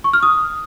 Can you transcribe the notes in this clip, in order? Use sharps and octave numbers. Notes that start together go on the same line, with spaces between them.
C#6
F6
D#6